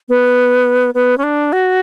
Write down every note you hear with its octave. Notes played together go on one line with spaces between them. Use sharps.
B3
B3
C#4
D4
F#4